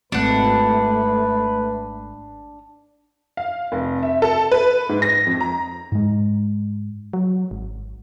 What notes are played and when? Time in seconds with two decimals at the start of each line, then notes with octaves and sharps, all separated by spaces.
0.12 G#1 A3 D4 B4 F#5
3.37 F5
3.72 F1
4.03 E5
4.22 A4
4.51 B4
4.89 G#2
5.02 A#6
5.26 F2
5.41 A#5
5.92 G#2 G#3
7.13 F#3
7.51 G#1